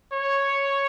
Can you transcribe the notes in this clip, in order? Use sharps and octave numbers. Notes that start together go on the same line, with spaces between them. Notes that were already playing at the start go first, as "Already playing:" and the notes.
C#5